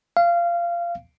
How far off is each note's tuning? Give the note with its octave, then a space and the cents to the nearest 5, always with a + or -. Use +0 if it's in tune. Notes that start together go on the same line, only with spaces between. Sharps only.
F5 -20